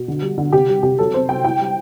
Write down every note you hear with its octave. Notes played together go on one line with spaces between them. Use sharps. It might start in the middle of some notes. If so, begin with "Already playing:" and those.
Already playing: B2
D3
G3
D3
C3 G4
G3
C3 G4
F#3 A4
C4 C5
F#3 G5
E4 G5
G3